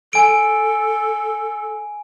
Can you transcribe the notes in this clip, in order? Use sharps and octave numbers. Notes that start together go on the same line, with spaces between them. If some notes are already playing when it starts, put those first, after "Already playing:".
A4 G#5 D7